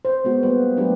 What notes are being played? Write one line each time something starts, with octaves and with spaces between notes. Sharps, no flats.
C5
G#3 B3 F#4
G3 A#3 B3 B4
F#3 A3 D4 G4 B4